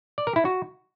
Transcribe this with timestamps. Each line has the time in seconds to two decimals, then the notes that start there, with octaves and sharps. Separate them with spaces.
0.18 D5
0.27 A#4
0.36 E4
0.45 F#4